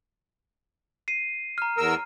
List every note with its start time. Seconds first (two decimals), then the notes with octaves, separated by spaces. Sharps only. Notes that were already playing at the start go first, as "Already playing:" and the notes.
1.08 C7 D#7
1.58 A#5 F6
1.78 E2 A#4 E6